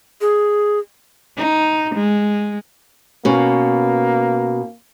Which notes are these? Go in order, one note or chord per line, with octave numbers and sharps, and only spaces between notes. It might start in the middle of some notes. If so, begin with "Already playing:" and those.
G#4
D#4
G#3
B2 A#3 C#4